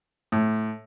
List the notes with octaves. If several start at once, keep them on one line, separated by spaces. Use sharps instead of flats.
A2